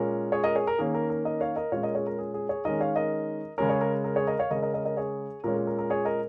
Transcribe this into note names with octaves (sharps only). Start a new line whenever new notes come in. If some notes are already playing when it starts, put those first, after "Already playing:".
Already playing: A#2 G#3 C#4 A#4
G#4 C#5
A#4 D#5
G#4 C#5
A#4
D#3 A#3 C#4 G#4
A#4
A#4
A#4 D#5
C#5 F5
A#4 D#5
A#2 G#3 C#4 C#5 F5
A#4 D#5
G#4 C#5
A#4
G#4
G#4
G#4 C#5
D#3 G#3 C#4 A#4 D#5
C#5 F5
A#4 D#5
C#3 G#3 C#4 A#4
G#4 C#5
A#4
A#4
G#4 C#5
A#4 D#5
C#5 F5
C#3 G#3 C#4 A#4 D#5
A#4 D#5
A#4 D#5
A#4 D#5
G#4 C#5
A#2 G#3 C#4 A#4
G#4
A#4
A#4
G#4 C#5
A#4 D#5